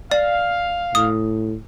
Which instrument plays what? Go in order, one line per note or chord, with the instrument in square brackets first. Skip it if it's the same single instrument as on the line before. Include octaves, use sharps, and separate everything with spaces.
[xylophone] D5 [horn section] F5
[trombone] A2 [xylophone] D#6